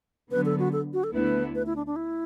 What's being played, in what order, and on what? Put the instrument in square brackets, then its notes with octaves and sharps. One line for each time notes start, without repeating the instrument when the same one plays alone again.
[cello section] D3 F#3 B3 [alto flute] B4
[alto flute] A4
F#4
A4
F#4
A4
[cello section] D2 D3 B3 E4 [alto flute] B4
[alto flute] B4
E4
D4
D4
E4